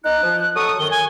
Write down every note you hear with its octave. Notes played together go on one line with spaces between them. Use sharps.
D#4 F#6
F3
F#6
F#3 A4 C#6 D#6
F#2 D#3 G7
G#5